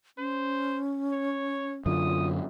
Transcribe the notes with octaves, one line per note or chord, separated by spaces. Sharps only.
C#4 C5
C#5
F#2 D3 F4 D#6